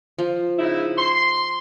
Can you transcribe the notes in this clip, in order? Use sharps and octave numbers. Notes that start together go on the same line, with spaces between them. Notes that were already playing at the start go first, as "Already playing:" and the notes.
F3
C#3 D#4 E4
C6